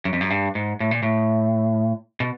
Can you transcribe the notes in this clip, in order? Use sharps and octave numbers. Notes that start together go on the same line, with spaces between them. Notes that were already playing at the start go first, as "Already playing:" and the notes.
F#2
F2
F#2
G2
G#2
A2
A#2
A2
B2